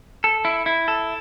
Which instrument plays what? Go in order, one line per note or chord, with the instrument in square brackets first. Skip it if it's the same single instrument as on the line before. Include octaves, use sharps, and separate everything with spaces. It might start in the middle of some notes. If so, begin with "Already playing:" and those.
[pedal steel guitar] A4
E4
E4
A4